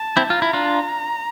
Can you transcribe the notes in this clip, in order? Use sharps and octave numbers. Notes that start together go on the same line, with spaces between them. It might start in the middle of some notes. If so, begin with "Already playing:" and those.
Already playing: A5
C4 E4
F4 A#5
E4
D4 F4